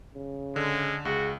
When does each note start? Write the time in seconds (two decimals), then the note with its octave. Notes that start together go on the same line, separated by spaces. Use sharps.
0.15 C#3
0.56 D3 G#3
1.05 C#2 F#4 G#4